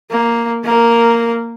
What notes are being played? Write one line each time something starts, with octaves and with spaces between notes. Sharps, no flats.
A#3
A#3 A#4